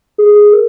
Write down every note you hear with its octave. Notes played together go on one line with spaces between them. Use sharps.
G#4
A#4